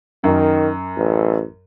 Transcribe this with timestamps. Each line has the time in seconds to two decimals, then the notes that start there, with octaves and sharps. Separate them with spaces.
0.24 F#2 D#3
0.97 A1